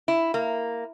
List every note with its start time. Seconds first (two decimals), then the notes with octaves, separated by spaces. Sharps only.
0.08 E4
0.34 A#3